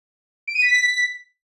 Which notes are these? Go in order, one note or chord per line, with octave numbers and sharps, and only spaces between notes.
D7
D#7
B6